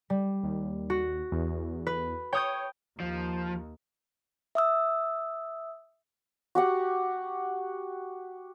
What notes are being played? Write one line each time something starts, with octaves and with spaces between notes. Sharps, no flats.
G3
D#2
F#4
E2
B4
C#5 G5 D#6 G6
D#2 F3
E5 D#6 E6
F#4 G4 F#5